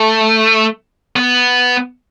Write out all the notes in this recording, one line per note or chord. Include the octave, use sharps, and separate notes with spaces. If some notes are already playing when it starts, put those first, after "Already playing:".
Already playing: A3
B3